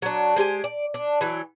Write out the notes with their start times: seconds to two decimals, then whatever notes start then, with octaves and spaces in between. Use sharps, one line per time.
0.02 F#3 D4
0.36 G#3 G4 C5 G#5
0.64 D5
0.94 D4
1.21 E3 F#3